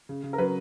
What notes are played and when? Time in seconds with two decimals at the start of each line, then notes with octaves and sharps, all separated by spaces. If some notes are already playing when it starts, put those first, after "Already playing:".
0.09 C#3
0.23 C#3
0.33 A#4
0.38 F#3 B4